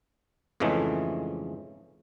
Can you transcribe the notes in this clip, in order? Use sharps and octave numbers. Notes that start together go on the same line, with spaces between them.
F2 G#2 C#3 E3 G#3 A3